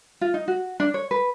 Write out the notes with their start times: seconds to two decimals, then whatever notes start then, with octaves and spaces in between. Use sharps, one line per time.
0.21 F4
0.34 D#4
0.48 F#4
0.80 D4
0.94 C#5
1.11 B4